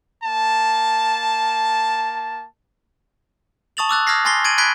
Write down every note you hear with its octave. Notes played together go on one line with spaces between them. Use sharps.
A#3 A5
A5 C#6 D#6 A6 F7 F#7
D6 E6 F#6 A6
D#6 F6 G#6 A#6 C7
G#5 C6 A6 A#6 C7 G7
G#6 A6 D7 D#7 F#7
B5 F#6 G#6 B6 D7 G7